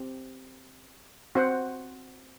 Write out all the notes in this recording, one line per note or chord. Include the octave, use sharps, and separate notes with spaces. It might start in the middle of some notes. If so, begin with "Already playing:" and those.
Already playing: C4 G4
C4 F#4 C5 F#5